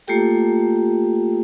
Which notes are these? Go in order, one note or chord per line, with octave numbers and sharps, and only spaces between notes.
A3 A#3 F4 G4 A4 G5